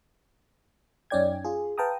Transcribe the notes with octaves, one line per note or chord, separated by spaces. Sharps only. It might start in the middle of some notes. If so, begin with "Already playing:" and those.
F#2 C#4 D#4 D5 G5 G#6
F4 G#4
B4 F5 G5 A5 A#5 D#6